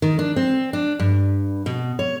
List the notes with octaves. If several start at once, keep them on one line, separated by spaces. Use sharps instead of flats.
D#3
D4
C4
D4
G2
B2
C#5